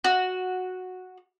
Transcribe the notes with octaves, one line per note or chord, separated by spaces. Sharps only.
F#4